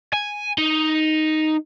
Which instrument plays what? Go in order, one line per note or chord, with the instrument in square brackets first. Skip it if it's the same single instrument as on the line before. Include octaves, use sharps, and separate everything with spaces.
[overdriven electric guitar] G#5
D#4